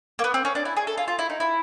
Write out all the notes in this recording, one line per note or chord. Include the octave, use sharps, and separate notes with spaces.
A#3
B3
C4
C#4
D4
E4
G#4
A4
F4
F4
E4
D#4
E4